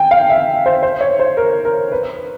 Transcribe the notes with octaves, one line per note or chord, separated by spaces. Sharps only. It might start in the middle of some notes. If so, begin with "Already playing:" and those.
Already playing: G5 G#5
F5
E5
C5
C5
C#5
C5
A#4
A#4
B4